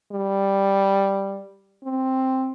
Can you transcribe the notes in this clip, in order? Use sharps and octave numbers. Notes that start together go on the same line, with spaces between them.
G3
C4